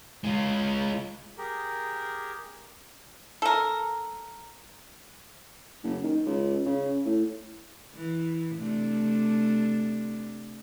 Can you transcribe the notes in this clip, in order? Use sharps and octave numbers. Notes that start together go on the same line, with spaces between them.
G#3 F4
G4 G#4 A#4
A4 A#4
F#1
D#3
C#2
C#3
A2
E3
C3 A3 D4